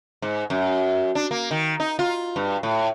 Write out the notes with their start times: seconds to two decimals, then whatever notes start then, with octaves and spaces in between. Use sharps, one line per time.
0.22 G#2
0.50 F#2
1.15 D4
1.31 A#3
1.51 D#3
1.80 D#4
1.99 F4
2.36 G2
2.63 A2